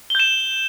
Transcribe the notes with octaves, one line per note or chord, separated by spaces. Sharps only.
G6 E7 G7